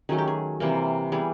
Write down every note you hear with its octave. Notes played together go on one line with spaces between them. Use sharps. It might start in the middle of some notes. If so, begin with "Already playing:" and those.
D#3 F#3 A3 C#4 G#4
G4
G#4
C3 E3 G3 A#3
E3 G3 B3 G#4